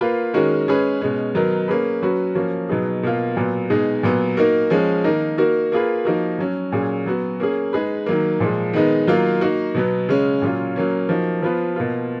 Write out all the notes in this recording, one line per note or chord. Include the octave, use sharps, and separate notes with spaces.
A#3 F4 B4
D#3 G#3 C#4 F#4 A#4
G#3 C#4 G#4 B4
B2 G#3 C#4
D#3 F#3 B3 D#4 A#4
A#3 C#4 G#4 B4
F#3 C#4 F#4 B4
F3 A#3 C#4 F#4
B2 F#3 B3 D#4 G#4
B2 A#3 F4
A#2 F#3 B3
B2 G#3 D#4 G#4
A#2 F#3 B3
A#3 D#4 F#4 A#4
F3 G#3 C#4
D#3 A#3 D#4 A#4
A#3 D#4 F#4 A#4
A#3 F4 G#4 B4
F3 A#3 D#4 F#4 A#4
F#3 C#4 F#4
A#2 F#3 C#4 G#4
F#3 B3 F#4
A#3 C#4 G#4
G#3 D#4 G#4 B4
D#3 F#3 A#3
A#2 F3 G#3
D#3 G#3 B3 D#4
D#3 F#3 A#3 F4
A#3 D#4 F#4
B2 F#3 B3
C#3 G#3 C#4
A#2 F#3 C#4 F4
F#3 A#3 C#4
F3 A#3 D#4 F#4
F3 B3 F4 B4
B2 A#3 F4